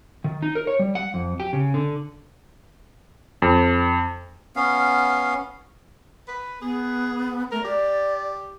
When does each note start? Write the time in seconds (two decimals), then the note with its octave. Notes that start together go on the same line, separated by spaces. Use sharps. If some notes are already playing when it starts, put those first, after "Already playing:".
0.24 D#3
0.42 D#4
0.55 A#4
0.67 C#5
0.79 G3
0.95 F#5
1.14 F2
1.40 G4
1.53 C#3
1.74 D3
3.42 F2
4.56 B3 C#4 F5
6.28 B4
6.62 B3 G#4
7.52 A3 A#4
7.64 G4 D5